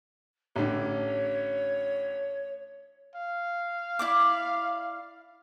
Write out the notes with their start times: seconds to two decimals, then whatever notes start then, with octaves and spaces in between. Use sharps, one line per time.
0.56 A1 D3 C#5
3.15 F5
3.99 E4 D5 D6